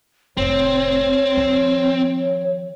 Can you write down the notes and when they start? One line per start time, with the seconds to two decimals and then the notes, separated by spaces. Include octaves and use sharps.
0.37 F1 A2 C4 C#5
1.37 D#3 F3